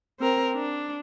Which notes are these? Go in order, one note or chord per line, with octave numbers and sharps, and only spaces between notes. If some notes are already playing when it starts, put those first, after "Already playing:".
C4 A#4
D4